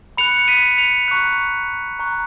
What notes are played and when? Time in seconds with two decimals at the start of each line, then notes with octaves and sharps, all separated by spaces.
0.17 B5 F#6 C#7 F7
0.38 C#7
0.48 B6 D#7
0.78 C#7 F7
1.08 A#5 C#6 F#6
1.99 A#5 C#6 F#6